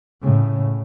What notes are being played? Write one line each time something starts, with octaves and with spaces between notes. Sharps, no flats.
A2 C#3